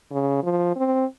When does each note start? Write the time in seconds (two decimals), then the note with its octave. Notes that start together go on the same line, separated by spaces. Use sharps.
0.11 C#3
0.43 F3
0.76 C4